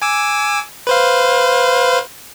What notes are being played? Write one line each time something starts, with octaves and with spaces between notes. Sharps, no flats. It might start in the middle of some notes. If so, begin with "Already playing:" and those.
G#5 D6 E6
B4 C5 F5